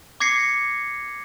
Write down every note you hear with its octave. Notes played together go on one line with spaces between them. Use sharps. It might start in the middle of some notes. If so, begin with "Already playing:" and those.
D6 G#6 A#6 C7 C#7